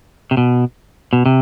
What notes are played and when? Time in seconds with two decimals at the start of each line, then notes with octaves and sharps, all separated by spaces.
0.31 C3
0.37 B2
1.13 B2
1.26 C3